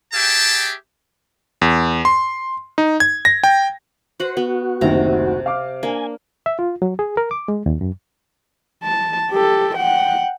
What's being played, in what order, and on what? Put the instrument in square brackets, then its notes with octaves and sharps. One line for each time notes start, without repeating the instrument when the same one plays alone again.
[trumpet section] G4 G#4 E5 G5 A5
[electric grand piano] E2
C6
D#4
G#6
A#6
G5
[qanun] F#4 B4 F#5 [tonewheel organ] C5
[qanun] B3 [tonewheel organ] F#4
[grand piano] F#1 D2 D#3 [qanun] C3 A#5
[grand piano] F5 D6 F6
[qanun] A#3 [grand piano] D4 [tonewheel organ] G#5
[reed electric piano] E5
F4
F#3
G#4
A#4
D6
G#3
D#2
F#2
[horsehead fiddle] A5
G4 A4
F#5 G5